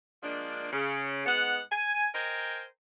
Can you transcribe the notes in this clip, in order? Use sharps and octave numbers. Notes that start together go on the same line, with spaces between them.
F3 G#3 A#3 D4
C#3
G#2 G#3 B3 F#5
G#5
A#4 C5 D#5 G5 G#5 A#5